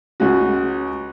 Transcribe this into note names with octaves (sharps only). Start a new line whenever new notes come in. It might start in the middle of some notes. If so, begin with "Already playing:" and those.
C#2 C#4 F#4